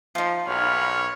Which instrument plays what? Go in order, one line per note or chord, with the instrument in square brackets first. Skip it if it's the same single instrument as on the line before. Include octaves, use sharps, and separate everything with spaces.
[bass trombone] F3 [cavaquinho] D#4 F4
[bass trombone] B1 [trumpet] C#5 [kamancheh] B5 F6